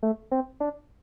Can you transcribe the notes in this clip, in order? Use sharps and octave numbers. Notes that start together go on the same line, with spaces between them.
A3
C4
D4